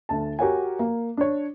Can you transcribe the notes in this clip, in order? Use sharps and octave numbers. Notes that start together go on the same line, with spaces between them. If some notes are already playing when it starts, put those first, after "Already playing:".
D2 A5
F#4 G4 A#4 C#5 F#5 G#5
A#3
D4 C#5